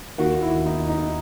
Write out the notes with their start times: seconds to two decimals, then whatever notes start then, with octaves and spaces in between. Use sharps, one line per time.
0.18 D#2 D#3 A#3 F#4
0.42 E4
0.66 D#4
0.89 D#4